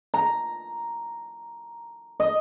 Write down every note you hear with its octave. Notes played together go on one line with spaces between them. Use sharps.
A#5
D#5